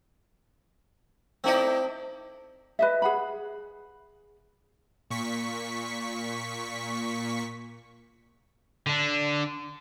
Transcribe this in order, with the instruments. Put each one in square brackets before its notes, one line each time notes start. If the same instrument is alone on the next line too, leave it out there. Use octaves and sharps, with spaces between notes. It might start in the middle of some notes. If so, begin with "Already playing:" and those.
[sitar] A3 D#4 E4 [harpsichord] C4 D5
[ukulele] B4 D#5 E5
G#4 F#5 B5
[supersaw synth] A#2 C#6 B6
[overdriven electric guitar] D3 D4